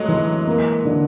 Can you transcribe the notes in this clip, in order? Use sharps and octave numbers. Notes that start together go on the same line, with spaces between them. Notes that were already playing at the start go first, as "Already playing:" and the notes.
Already playing: F#3 G#3 A3
E3
A#3
D3